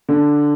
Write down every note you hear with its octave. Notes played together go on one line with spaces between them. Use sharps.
D3